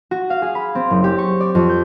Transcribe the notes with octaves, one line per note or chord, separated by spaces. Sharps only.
F#4
F5
G#4
B5
C4
F#1
G4
C#6
D5
F2
G6